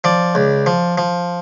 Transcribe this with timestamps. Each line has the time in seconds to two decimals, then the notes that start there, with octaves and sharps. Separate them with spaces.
0.04 F3 D5
0.35 C#2
0.66 F3
0.98 F3